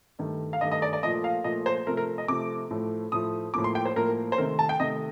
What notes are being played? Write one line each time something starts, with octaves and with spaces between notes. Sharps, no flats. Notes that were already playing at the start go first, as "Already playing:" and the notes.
G2 D#3 A3
F5
G2 D#3 A3 D#5
D#5
D5
D5
A#2 F3 A3 D#5
F5
A#2 F3 A3 D#5
C5
C3 F3 A3 A#4
A#4
D#5
C3 F3 A3 D6
A2 F3 A3
A2 F3 A3 D#6
A2 F3 A#3 D6
C6
G5
C5
A2 F3 A#3 A#4
C5
C3 D#3 A3 A#4
A5
G5
C3 D#3 A3 D#5